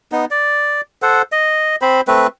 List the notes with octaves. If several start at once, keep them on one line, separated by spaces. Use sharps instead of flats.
B3 D#4
D5
A4 C5 F#5
D#5
C4 C5 B5
A3 C4 B4